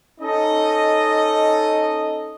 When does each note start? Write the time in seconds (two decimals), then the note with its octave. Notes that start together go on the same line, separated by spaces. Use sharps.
0.21 C#4 D#4 A4 D#5